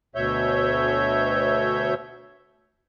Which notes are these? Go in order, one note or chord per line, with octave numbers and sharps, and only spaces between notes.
D2 B2 C#5 E5 G6